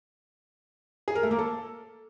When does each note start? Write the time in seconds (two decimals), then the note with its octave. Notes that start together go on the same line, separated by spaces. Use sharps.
1.08 G#4
1.15 A#4
1.23 A3
1.31 A#3
1.39 A4